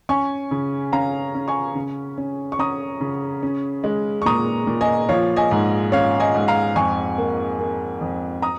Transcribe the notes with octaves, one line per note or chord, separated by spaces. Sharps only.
C#4 G#5 C#6
C#3
C#4 F5 A#5
C#4
G#5 C#6
C#3
C#4
C#6
C#4 A#5 D#6
C#3
C#4
G#3
C#6
A#2 A#5 D#6
A#2
D#5 G#5
F3 C#5 F5
D#5 G#5
G#2
C#4 C#5 F5
D#5 G#5
G#2
F5 A#5
F2 G#5 C#6
A#3
A#3
F2
A#5 D#6